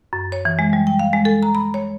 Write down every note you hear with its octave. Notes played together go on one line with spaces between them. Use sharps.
F#2
C#5
E3
G#3
G3
G5
F5
G#3
A4
A#5
B5
C#5